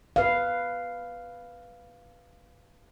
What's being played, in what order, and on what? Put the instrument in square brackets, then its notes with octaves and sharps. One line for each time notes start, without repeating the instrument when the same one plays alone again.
[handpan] B4 F5